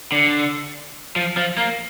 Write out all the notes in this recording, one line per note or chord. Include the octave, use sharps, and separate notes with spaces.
D3
F3
F3
A#3